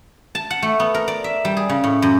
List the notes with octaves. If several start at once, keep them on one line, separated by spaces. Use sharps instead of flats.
A5
F#5
A3
B3
A#4
D5
E5
G3
G#4
C#3
A2
F#2